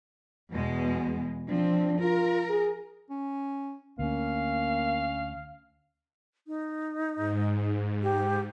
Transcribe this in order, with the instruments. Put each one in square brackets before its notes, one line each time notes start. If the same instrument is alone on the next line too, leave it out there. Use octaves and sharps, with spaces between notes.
[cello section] E2 B2 G#3
[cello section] F3 C4 [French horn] D4
[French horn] F4 [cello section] A#4
[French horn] G#4
[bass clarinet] C#4
[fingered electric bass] D2 [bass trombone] A#3 [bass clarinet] C#4 [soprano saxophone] F5
[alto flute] D#4
[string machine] G#2
[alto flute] G4